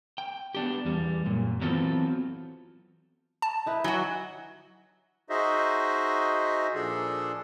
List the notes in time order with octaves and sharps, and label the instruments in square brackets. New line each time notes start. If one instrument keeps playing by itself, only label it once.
[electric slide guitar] G5
B3 D4 G4
E2 G3
F#2 A#2
E3 F#3 B3 C4 F4 A4
[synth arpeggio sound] A5
[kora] D#4 E4 B4
[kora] E3 [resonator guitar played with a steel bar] F#3 F#4
[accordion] D#4 F#4 G#4 C5 D#5 E5
A#2 F3 D4 G#4 A4